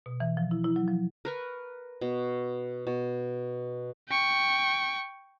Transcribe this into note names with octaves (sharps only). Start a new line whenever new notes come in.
B2
E3
F3
E4
E4
F#3
F3
A#4 B4 C#6
B2
B2
G5 C#6